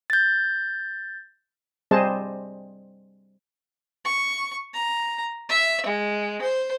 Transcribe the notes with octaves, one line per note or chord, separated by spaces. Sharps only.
G6 A6
G3 C4 G#4 C5 D#5 A5
C#6
A#5
E5
G#3
C5